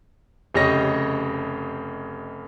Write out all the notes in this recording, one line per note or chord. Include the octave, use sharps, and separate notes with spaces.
F1 C#3 G4 C#5 D#5 A#6